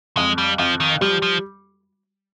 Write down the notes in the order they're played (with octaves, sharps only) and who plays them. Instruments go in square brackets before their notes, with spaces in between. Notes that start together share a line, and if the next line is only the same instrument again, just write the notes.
[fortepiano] F2 [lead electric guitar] G#3
[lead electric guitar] G3
[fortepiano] F2 [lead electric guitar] F3
[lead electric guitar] D#3
[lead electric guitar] F3 [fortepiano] G3
[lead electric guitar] F3